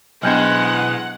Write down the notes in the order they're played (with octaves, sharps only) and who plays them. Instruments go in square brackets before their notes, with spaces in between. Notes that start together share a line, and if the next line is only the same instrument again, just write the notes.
[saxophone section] E2 G#3 [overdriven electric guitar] B2 C5 [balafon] F#3 B3 D4 [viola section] F#5